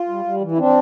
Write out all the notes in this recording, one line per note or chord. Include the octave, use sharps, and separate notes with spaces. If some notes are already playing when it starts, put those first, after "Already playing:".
Already playing: F4
G3
G3
E3
E4
C4 D4